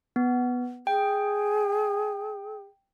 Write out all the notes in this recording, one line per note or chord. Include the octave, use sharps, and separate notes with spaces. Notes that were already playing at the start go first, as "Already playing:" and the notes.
B3
G#4 G5